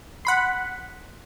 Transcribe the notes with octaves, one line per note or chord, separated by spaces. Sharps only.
F#5 B5 C6